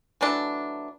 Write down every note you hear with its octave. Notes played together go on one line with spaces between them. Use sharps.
E3 F#3 A3 D4